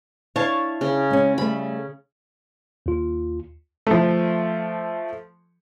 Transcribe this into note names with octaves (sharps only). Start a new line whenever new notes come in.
D4 E4 C#5 F5 A5
C#3
G#3 C#4
G3 A3 B5
D#2 F4
F3 A3